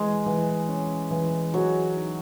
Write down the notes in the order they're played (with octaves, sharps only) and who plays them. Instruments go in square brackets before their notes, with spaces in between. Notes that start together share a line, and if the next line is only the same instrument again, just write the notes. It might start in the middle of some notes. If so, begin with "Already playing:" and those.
Already playing: [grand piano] E3 [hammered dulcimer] G#3
[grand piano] E3
C#4
E3
[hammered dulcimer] F#3 [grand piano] G#4
[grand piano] D#4